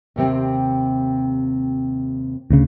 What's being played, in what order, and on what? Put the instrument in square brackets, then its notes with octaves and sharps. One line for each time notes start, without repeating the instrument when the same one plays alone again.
[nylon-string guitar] D#2 C3 C4
[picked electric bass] D2 C#3